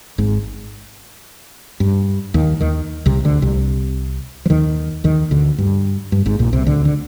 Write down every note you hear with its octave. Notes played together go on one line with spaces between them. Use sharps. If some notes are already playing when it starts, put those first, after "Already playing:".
G#1 G#2
G2
D#2 D#3
D#2 D#3
C2 C3
D2 D3
C2 C3
F3
D#2 D#3
D#2 D#3
D2 D3
G2
G2
G#1 G#2
A#1 A#2
C2 C3
D2 D3
D3